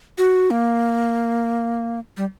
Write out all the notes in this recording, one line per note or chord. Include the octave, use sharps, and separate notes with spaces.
F#4
A#3
G3